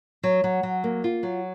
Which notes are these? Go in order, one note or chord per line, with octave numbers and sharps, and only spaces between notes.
F#3
F#3
F#3
A#3
F4
F#3